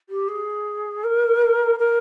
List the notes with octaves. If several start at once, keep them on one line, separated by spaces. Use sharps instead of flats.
G4
G#4
A#4
A#4